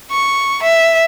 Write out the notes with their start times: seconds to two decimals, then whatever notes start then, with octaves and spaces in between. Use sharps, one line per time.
0.11 C#6
0.63 E5